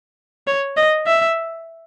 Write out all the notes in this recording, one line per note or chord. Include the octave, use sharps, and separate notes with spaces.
C#5
D#5
E5